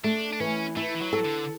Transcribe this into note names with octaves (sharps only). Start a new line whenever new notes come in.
A3 D4
D4
E3 C#4
A3 E4
E3
F#3
A4
D3